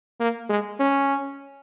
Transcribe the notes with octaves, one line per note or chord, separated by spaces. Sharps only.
A#3
G#3
C#4